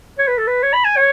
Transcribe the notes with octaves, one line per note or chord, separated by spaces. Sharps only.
C#5
B4
A4
B4
C#5
B5
G#5
C#5